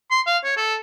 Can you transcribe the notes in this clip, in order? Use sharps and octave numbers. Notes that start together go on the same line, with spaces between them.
C6
F5
C#5
A4